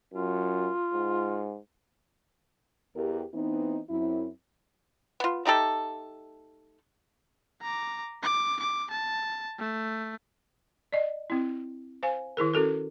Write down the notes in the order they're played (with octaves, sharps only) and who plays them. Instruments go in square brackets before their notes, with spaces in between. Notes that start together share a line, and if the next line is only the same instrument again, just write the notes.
[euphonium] F#2 [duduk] F4
[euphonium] G#2
[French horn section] E2 G4 A#4
E3 B3 C4 D#4
F#2 C4 E4
[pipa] B3 F4
A3 D#4 G4 A4
[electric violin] A#5 D6
D6
D6
A5
A3
[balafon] D5 D#5
C4 E4
C5 F5 G#5
D#3 E4 G#4 A#4
C#4 F#4 A4 A#4